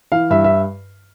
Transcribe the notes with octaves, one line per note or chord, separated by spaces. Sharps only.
E3 F5
G2 E5
E5